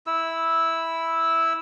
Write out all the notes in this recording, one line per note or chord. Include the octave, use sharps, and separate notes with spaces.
E4 E6